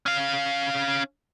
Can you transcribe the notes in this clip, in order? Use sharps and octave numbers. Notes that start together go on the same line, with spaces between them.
C#4 F5